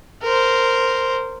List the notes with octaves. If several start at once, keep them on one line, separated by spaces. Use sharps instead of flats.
A#4 C5